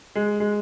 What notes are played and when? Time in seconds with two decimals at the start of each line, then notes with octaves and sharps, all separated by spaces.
0.15 G#3
0.40 G#3